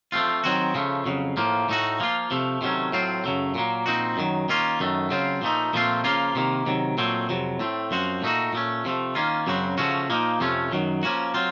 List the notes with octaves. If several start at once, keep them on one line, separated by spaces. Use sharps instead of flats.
F3 A3 C4 F4
D#3 F#3 C4 F#4
C#3 F3 A3
F2 C#3 F#3
A2 F3 A#3
A2 A3 D#4 F#4
F3 A#3 F4
C3 F3 A3
C3 D#3 F#3 A3 C#4
A2 F#3 C4 F4
F#2 C#3 F#3 A3
A#2 F#3 A#3
A#2 F3 C4 D#4 F#4
F#2 D#3 F#3
D#3 A#3 C#4 F4
F#2 D#3 A3
C#3 F#3 C4 F4
A#2 F3 A3 D#4
A#2 F3 A3 C4 F4
C#3 F3 A#3 F4
C3 D#3 A#3
C3 D#3 F#3
A#2 F#3 A3 C4
F2 C3 F#3
A2 A3 C4
F#2 F3 C4 F#4
A#2 A3 D#4 F#4
A#2 A3 C#4
C3 F3 A3
D#3 A#3 C#4 F4
F#2 C#3 F#3 C4 F#4
C#3 F3 A3 C#4 F#4
A#2 F3 A#3 D#4
F2 C3 F3 A3 C#4
F#2 D#3 F#3
F3 A#3 C#4 F#4
F#3 C4 F4